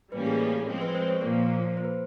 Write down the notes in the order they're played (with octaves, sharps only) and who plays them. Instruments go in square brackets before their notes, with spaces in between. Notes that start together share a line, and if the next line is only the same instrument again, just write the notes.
[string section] A2 E3 G3 A#3 C#4 [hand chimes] B4
[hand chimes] G#4
A4
[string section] F3 G#3 C4
[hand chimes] B4
C5
C#5
[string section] A#2 F3 A#3 [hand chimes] D5
[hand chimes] C5
C5
B4